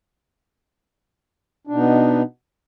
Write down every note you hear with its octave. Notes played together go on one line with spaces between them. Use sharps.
B2 B3 D4 D#4